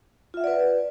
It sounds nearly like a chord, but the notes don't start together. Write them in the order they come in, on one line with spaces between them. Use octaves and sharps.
F4 E5 F#5 D5 B4